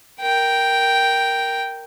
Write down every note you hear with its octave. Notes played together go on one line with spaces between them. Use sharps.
A#4 G5